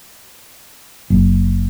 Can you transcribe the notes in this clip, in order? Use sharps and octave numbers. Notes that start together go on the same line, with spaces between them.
F#1